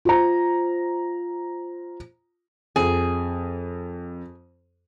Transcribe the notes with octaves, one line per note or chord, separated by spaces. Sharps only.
F4 C5 A#5
F2 G#4